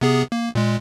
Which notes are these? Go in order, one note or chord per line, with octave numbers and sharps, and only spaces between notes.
C3 B3 G#4
A#3
A#2 G#3